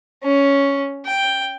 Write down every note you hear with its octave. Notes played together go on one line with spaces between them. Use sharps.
C#4
G5